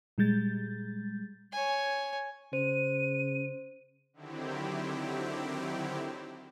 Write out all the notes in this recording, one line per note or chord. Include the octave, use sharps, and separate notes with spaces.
A#2 G3 G#3 G6 A6
C#5 G#5
C#3 C5 D#7
D3 D#3 F#3 C4 E4 G4